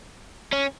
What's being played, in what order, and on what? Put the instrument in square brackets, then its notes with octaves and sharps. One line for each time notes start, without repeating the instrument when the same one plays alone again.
[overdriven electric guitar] C#4